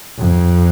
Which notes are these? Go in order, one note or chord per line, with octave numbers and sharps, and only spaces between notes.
F2